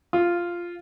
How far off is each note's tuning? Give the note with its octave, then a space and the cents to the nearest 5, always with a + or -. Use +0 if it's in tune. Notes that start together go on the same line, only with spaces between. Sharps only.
F4 -5